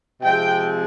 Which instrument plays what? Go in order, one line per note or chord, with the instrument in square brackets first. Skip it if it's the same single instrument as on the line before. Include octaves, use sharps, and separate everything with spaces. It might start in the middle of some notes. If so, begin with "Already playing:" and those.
[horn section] C3 F3 G#3 C4 G5